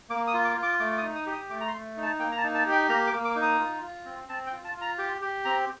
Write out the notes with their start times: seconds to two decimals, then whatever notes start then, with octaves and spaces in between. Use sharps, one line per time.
0.10 A#3 D6
0.27 D#6
0.34 F4
0.45 D6
0.57 F4
0.63 D6
0.80 A3 D6
0.92 D6
0.98 D#6
1.03 D#4
1.15 D#6
1.27 G4
1.32 D#6
1.50 A3 D6
1.61 A#5
1.68 C6
1.74 A3
1.97 D#4
2.03 A5
2.19 A#3 G5
2.32 A#5
2.38 A5
2.43 D#4
2.54 A5
2.66 G4
2.72 G5
2.89 A#3 A#5
3.07 D6
3.13 A#3
3.25 D6
3.36 D#4
3.42 D#6
3.60 F4
3.82 F4
4.05 C4
4.29 C4 A5
4.47 G5
4.52 F4
4.65 A5
4.75 F4
4.81 A#5
4.98 G4 D6
5.22 G4
5.45 C4 A#5